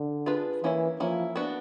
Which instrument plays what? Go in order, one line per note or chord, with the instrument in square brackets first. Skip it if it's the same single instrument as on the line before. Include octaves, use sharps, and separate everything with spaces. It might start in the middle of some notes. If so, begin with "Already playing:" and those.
Already playing: [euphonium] D3
[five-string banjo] D4 F4 G#4 B4
[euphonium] E3 [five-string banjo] A#3 C#4 E4
[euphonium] F3 [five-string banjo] A#3 C#4 E4
[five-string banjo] B3 D4 F#4